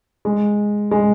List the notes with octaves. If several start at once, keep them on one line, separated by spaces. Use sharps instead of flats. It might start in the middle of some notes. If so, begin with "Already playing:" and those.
G#3
G#3